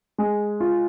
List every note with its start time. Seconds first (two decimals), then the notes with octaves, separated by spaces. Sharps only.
0.18 G#3
0.60 F4